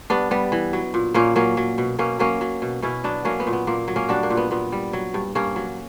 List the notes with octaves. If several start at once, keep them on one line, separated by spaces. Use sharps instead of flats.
G2 B3 D4
G3 B3
E3
F#3
A#2
A#2 A#3 C#4
F#3 A#3 C#4
F#3
B2
B2 A#3 C#4
F#3 A#3 C#4
F#3
B2
B2 C#4 E4
F#3 B3 D4
F#3 A#3 C#4
B3
A#2
B3
A#2 A#3
F#3
A#3 C#4
G3 D4 F#4
A#3
A#2
B3
A#2 B3
G3
F#3
G2
G2 A#3 C#4
F#3